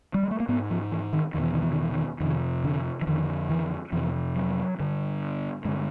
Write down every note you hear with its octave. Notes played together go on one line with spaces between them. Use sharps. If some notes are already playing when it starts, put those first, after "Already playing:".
G3
G#3
A3
A#3
G#2 B3
F3
E3
D#3
E2 B2 D#3
E3
D#3
E3
D#3
E3
D#3
F2 C3 D#3
D3
E3
F2 D3 D#3
E3
F2 C3 E3
F#3
G2 D3
G2 D3 G#3